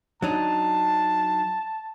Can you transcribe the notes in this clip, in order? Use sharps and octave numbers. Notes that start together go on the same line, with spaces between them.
F#3 D4 D#4 A5